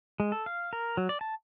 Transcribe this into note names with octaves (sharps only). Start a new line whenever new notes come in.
G#3
A4
F5
A#4
F#3
D5
A5